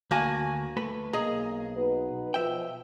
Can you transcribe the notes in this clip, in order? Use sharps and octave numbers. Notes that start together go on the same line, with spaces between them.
D2 A#3 F#4 G#5 A5
A3 B4 B5
B1 A#3 G#4 D#5 A#5
D#4 F#4 B4
B2 F3 E5 G5